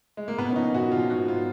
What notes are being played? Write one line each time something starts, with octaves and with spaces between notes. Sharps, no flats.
G#3
A#3
A#1 B3
C#4
A#2 F3 D#4
A#1 F#4
A#2 F3 F4
G#1 F#4
F#3 B3 F4